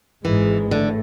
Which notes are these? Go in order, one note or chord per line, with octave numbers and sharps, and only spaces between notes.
G#1 G#2 E3 G#3
A2 D3